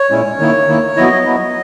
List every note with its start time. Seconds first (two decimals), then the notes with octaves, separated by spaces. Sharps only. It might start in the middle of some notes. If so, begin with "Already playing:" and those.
Already playing: C#5
0.11 A#2 G#3 C#4 E4
0.40 D#3 A#3 E4
0.68 D#3 A#3 E4
0.97 F#3 B3 E4 D#5
1.26 F#3 B3 E4